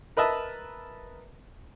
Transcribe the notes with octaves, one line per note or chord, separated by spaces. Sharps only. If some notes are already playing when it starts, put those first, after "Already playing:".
A#4 B4 D#5 E5 A5